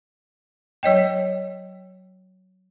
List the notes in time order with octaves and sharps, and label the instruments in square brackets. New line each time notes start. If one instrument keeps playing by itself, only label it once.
[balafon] F#3 C#5 D#5 G5